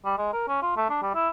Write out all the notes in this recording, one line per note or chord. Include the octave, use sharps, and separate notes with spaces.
G3
G#3
A#4
C#4
F4
A3
D4
G3
E4